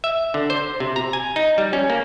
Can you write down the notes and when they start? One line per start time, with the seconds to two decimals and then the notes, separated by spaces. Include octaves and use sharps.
0.04 E5
0.34 D3
0.50 C5
0.80 C3
0.96 A#5
1.13 G#5
1.36 D#4
1.58 G3
1.73 C#4
1.90 A#3